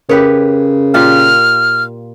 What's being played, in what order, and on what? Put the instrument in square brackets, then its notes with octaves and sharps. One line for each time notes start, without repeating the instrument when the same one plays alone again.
[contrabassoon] C#3 [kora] G4 B4 C#5 [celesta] A#4
[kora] A#2 F4 G4 [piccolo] F6